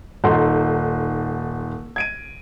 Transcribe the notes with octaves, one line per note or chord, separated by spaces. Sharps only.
D#1 D#4 A4 F#5 C6
G#6 D7 D#7